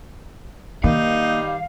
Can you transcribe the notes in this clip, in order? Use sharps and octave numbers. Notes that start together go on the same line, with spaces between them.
D#3 G3 A#3 D#4 F5